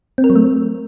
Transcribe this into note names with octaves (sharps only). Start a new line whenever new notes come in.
C4
A#4
F#3
A3